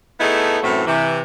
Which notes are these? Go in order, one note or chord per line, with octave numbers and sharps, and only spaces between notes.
A3 B3 D#4 E4 G#4 A4
F#2 A2 E3 F#3 A3 C4
C3 E3